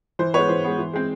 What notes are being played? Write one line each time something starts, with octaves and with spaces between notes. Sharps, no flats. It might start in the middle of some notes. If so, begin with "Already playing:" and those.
E3 C5
G#3 B3 B4 C#5
E3 C5
G#3 B3
E3
G#3 C4